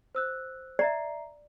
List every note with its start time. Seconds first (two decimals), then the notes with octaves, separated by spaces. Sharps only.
0.15 C5 E6 F#6
0.79 D5 E5 A#5 C7